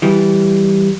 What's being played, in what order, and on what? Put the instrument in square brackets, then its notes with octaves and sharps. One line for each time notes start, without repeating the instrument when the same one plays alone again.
[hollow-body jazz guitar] E3 G3